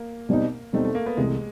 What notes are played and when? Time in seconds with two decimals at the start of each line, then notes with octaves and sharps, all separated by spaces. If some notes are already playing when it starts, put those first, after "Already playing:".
Already playing: A#3
0.29 B2 G3 C4 D#4
0.73 B2 G3 A3 C4 D#4
0.85 A3
0.95 A#3
1.06 B3
1.17 C2 C3 E3 G#3 A3